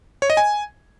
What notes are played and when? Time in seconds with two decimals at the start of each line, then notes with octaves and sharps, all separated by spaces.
0.22 C#5
0.30 D#5
0.37 G#5